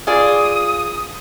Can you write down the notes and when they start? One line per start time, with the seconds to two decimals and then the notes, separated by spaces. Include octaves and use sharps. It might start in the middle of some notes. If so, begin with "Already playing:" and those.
0.07 F4 G#4 D5 D#6